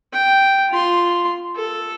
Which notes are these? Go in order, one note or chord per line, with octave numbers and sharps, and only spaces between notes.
G5
F4 C6
A4